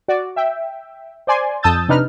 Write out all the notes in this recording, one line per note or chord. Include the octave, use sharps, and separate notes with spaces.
F#4 D5
E5 G5
C5 D5 G#5 C6
F2 A5 D#6 E6 G6 A6
C3 D4 D#4 B4 F6